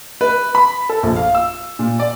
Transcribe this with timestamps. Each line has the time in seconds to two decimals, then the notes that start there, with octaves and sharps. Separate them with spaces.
0.21 B4
0.55 B5
0.89 A4
1.03 A#1
1.16 F5
1.35 E6
1.79 A#2
2.00 D5